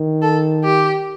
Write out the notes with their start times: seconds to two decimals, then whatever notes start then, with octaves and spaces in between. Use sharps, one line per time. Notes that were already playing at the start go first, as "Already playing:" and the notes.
Already playing: D#3
0.22 A4
0.64 G4